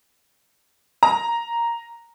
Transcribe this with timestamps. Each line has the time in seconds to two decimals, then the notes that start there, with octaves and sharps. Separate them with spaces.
1.03 A#5